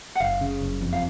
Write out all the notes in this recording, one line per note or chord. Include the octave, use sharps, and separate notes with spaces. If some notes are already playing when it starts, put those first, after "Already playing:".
F#5
F#1 F5
C#3
F#1
F2
F5